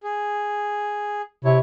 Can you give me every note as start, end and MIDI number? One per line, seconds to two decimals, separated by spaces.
0.03 1.22 68
1.45 1.59 48
1.45 1.59 64
1.45 1.59 73